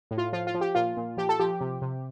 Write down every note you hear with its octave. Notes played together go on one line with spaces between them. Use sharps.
A2
F4
F3 F4
F4
F3
G4
A#2 F4
A#2
F3 G4
A4
F3 G4
C3
C3